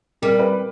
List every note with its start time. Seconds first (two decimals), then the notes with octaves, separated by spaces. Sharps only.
0.22 G3 A#4
0.39 B4